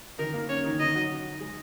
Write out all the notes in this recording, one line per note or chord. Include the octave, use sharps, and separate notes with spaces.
D#3 D#4 A#4
A#3
C#4 C#5
D#3 D#4
D#3 D#4 D#5
F#3 F#4
G#3 G#4